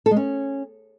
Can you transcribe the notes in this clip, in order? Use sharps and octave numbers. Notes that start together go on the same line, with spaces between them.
A4
G#3
C#4